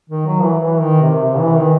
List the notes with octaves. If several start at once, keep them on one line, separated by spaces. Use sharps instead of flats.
D#3
F#3
E3
E3
D#3
C3
C3
E3
D#3